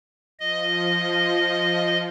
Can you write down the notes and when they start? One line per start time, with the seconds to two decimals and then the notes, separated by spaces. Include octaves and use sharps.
0.40 F3 D#5